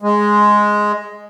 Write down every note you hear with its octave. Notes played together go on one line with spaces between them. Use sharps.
G#3